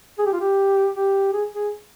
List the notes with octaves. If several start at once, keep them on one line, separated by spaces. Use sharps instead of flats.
G#4
G4
F4
G4
G4
G#4
G#4